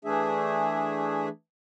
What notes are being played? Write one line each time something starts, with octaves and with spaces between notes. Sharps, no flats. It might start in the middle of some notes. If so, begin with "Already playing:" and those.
E3 A3 D4 G#4 E5